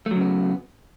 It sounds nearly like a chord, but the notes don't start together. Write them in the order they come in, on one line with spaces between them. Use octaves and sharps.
A3 F#3 C#3 B3